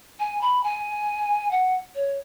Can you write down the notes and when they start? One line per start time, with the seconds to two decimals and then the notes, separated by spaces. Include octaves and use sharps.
0.19 G#5
0.41 B5
0.63 G#5
1.51 F#5
1.95 C#5